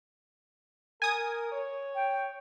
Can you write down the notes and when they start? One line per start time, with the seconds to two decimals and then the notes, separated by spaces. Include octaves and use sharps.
1.02 A#4 G#5 D#6
1.52 C#5
1.95 G5